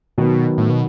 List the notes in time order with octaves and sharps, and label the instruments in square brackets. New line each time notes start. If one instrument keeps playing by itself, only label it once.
[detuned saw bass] B2 [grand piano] D#3 F#3 B3
[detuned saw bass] A2
B2